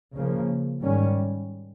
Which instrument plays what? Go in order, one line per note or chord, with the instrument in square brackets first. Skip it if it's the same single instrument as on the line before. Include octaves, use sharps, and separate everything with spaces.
[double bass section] C#3 F3 A#3
G#2 D#3 G3 C#4